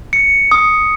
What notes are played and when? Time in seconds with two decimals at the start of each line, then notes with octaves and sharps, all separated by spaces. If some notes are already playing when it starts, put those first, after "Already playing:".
0.13 C#7
0.51 D#6